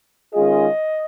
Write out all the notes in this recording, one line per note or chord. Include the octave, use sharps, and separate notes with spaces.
D#3 G#3 C#4 F4 G#4 D#5